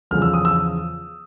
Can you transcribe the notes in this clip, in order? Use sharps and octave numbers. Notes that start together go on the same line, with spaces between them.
E2 C#3 F3 F6
E6
D#6
E6